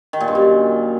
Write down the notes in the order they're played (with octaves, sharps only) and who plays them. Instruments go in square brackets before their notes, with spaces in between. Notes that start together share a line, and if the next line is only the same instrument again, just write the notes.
[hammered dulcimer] D#3
A#2
G2
F#2